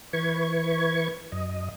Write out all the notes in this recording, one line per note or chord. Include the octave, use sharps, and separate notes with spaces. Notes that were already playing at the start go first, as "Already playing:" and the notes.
E3 B4 C#6 G#6
F#2 D#5